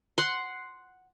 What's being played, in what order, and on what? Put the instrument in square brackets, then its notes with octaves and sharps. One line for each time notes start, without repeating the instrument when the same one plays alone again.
[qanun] F#5 C6